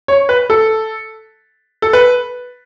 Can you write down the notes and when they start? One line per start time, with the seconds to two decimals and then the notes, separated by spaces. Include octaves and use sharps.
0.08 C#5
0.29 B4
0.50 A4
1.82 A4
1.93 B4